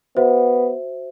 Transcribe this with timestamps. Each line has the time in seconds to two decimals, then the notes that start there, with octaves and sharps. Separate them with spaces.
0.17 B3 F#4 C5 E5